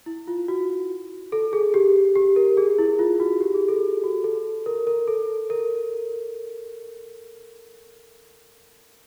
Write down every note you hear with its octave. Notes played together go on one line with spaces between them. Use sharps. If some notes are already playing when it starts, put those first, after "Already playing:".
E4
F4
F#4
A4
G#4
G4
G4
A#4
G#4
E4
F4
F#4
G4
G#4
A4
F#4
A4
A#4
A#4
A4
A#4